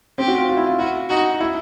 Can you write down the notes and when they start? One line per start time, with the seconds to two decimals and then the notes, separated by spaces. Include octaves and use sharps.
0.18 C4 G4
0.28 F#4
0.38 F4
0.49 F4
0.57 E4
0.67 F4
0.79 E4 F#4
1.09 D#4 F#4
1.40 E4